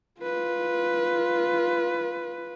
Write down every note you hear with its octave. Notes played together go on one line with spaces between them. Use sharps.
F4 B4